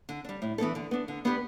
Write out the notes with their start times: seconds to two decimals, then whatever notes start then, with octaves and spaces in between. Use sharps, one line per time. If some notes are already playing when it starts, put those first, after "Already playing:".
0.09 D3
0.25 G3 D4
0.42 A2
0.58 E3 B3 D4 A4
0.75 D3
0.91 B3 D4
1.08 D3
1.25 B3 D4 G4 B4